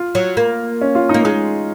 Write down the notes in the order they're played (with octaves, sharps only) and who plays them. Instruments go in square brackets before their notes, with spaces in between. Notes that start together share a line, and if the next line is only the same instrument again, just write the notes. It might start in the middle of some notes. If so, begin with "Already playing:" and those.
Already playing: [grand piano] F4
[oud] F#3
A#3
[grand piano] C#4
F4
[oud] A#3 [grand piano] D#4
[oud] G#3 [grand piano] D#4